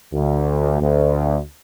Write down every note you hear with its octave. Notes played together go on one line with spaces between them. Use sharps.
D2
D2